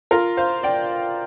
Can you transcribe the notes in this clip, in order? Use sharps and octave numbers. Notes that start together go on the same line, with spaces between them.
F4 A#4
C5 F5
D5 G5